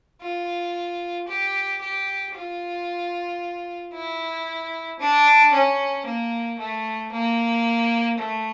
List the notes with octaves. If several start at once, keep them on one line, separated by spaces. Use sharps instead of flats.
F4
G4
G4
F4
E4
D4
C#4
A#3
A3
A#3
A3